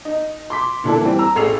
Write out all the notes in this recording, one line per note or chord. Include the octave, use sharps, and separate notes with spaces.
D#4
C6 D6 B6
A#2 D3 D4 E4 A4
E3 G3 C4
A#5 E6
A1 A3 G#4 C7 F7